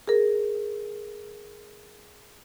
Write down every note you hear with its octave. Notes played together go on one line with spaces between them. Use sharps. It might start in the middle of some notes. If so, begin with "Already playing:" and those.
G#4 A#4